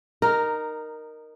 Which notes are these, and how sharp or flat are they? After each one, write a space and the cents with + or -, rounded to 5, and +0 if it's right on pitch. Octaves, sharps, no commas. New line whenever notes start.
D#4 -15 A#4 +0